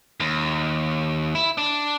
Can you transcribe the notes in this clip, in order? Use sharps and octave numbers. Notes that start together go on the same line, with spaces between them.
D#2
E4
D4